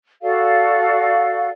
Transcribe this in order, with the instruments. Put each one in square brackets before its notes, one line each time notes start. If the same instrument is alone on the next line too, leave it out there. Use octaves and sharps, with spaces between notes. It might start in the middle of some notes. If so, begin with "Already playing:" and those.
[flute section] F#4 A4 D5 F5